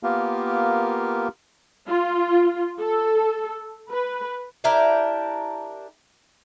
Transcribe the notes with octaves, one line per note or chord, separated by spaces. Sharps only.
A#3 B3 F4 G4 A#4
F4
A4
B4
D4 E4 G4 A#4